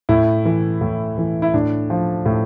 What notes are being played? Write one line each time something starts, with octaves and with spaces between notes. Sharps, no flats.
A2 E4
E3
A2
E3
E4
A2 D4
F3
A2